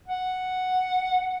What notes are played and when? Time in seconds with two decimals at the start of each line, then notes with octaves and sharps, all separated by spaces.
0.08 F#5